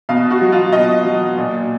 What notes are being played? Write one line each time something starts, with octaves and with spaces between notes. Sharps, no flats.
B2 F5
F#4
F#3
F4
B2 D#5
F#3
A#2